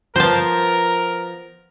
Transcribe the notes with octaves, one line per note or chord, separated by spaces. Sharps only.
F3 B3 A#4 C5 A5